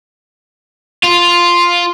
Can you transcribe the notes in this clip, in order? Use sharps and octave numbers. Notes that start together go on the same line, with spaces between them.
F4